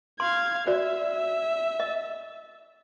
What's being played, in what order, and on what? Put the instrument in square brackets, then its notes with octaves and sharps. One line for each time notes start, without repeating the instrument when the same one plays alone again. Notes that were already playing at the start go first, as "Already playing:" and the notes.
[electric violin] F5 G#6 [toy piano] C6
[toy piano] F#4 C5 D5 [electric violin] E5
[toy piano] D#5